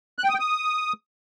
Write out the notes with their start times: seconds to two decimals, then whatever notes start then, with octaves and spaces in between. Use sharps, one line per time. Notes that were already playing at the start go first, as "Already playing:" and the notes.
0.19 F#6
0.24 G5
0.29 D#6
0.34 G5
0.39 D#6